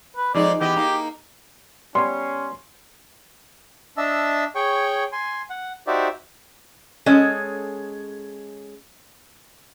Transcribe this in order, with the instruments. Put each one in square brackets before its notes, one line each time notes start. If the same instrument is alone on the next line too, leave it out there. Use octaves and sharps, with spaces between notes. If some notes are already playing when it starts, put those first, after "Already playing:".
[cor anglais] B4
[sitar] F2 G#3 D#4 [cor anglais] D5
[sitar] E3 B3 D#5 [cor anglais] G4
[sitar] A#3 D#4
[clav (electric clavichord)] G3 B3 C#5 [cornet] C#4 [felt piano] C6
[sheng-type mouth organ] D4 D#5 E5 A5 E6
G#4 C#5 G5 C#6
G#5 C6
F#5
D#4 F#4 G4 C5 D5 E5
[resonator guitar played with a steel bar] G#3 C#4 A4 C#5 D#5